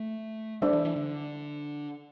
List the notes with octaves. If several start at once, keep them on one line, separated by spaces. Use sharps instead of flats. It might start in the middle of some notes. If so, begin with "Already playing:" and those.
Already playing: A3
G3 D4 A4 C5 E5
E3
E3
D3